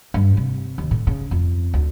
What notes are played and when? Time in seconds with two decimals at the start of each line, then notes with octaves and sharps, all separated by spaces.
0.14 G2
0.37 C3
0.78 D#2
0.91 A2
1.07 C#3
1.31 F2
1.74 D2